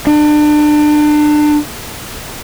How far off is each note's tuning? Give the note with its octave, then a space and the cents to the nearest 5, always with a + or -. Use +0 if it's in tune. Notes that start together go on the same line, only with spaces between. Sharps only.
D4 +30